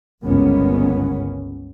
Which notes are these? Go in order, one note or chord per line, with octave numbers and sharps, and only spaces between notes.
G1 C#2 G2 A#3 B3 C#4